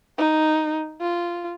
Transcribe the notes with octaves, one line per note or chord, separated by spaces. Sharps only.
D#4
F4